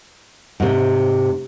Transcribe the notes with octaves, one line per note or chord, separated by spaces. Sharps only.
G#2 C3